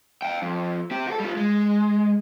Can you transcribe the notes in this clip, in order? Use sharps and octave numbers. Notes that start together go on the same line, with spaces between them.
F5 G5
F2
C4 G4
F#4 A4
G3 F4
G#3